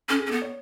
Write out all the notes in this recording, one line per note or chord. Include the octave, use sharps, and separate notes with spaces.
C#4 A4
G#4
B3 C#4 A4
C#5